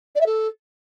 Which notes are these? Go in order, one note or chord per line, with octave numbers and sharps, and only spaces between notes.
D5
E5
A4